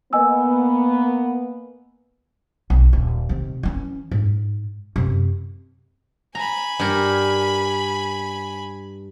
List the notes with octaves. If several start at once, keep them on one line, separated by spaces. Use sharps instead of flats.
A#3 B3 D#5 G#5 E6
B1
D#1
C3 D#3
E3 C#4
G#2
F#2 C3
G#5 A#5 B5
G2 A#4